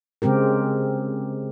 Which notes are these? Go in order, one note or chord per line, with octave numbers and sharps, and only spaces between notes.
C#3 G#3 C4 G4 A#4